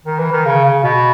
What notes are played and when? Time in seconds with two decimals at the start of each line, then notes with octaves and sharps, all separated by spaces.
0.05 D#3
0.19 E3
0.32 D#3
0.45 C#3
0.64 C#3
0.83 B2